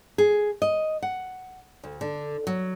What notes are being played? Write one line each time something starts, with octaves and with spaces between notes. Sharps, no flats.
G#4
D#5
F#5
D2
D3
F#3